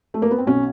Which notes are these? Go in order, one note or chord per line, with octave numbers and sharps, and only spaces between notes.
A3
A#3
B3
C4
B1 C#4